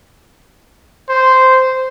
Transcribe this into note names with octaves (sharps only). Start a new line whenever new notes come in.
C5